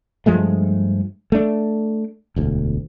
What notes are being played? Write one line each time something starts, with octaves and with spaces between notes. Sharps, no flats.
G2 F3 G#3 A3
A3 D4
E1 D2